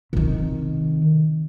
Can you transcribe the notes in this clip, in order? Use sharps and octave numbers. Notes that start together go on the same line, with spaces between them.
C3 D#3